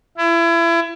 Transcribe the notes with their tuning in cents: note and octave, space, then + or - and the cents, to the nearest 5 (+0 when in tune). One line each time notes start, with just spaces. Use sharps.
E4 +30